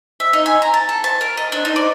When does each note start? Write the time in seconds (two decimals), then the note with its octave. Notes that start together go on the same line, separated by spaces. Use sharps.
0.20 E5
0.33 D#4
0.46 G#5
0.62 A#5
0.74 A5
0.89 A4
1.04 A5
1.21 A#4
1.37 D#5
1.52 D4
1.65 D#4
1.76 D5